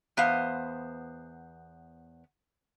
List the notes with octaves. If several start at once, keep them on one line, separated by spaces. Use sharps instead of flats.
E2 B3 C5 F5